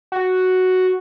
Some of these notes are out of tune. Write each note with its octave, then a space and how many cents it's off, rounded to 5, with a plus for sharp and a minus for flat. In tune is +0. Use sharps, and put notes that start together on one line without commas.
F#4 +0